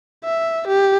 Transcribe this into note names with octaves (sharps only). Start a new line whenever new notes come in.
E5
G4